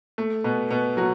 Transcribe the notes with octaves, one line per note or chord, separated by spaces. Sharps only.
A3
B2 B3
B2 B3
F#3 F#4